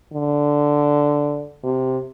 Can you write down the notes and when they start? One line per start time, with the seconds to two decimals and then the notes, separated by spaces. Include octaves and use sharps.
0.13 D3
1.64 C3